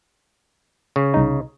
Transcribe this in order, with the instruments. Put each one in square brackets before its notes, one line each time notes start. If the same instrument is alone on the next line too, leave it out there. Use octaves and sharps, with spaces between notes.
[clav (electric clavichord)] C#3
[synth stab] C2 D#4